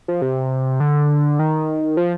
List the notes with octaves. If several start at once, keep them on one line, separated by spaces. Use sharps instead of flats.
F3
C3
D3
D#3
F3